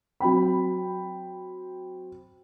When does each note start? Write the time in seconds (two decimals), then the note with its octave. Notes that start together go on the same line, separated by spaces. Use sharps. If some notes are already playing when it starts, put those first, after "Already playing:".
0.20 F#3 C4 G5 B5